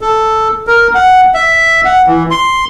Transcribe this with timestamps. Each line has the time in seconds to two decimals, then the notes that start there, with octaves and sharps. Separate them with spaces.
0.01 A4
0.67 A#4
0.95 F#5
1.34 E5
1.85 F#5
2.07 E3
2.31 C6